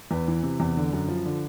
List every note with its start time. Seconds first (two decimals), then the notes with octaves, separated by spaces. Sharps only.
0.11 E2 B4
0.28 E3
0.43 C3
0.60 E2
0.77 D3
0.93 F#2
1.08 F3
1.25 D3